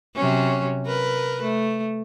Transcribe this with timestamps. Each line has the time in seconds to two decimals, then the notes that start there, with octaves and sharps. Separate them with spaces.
0.15 C3 F#3 C#4
0.86 A#4 B4
1.43 A3